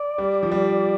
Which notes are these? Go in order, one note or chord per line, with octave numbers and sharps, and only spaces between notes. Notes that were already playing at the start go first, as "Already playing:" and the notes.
Already playing: D5
G3
F3
G3